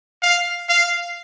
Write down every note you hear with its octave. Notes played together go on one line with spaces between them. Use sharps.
F5
F5